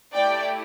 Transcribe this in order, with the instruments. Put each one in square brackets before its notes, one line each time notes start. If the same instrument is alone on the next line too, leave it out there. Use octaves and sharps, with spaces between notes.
[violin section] A3 E4 G4 D5 G5